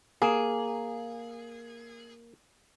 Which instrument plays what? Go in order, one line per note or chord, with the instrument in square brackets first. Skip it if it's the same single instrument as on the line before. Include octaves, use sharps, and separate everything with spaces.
[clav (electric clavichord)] A#3 [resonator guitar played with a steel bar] G#4